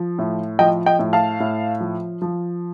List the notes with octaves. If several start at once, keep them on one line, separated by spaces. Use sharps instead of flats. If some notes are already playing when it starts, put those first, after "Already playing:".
Already playing: F3
A2
F3 D#5 G5
D#5 G5
A2
F5 A5
A2
F3
F3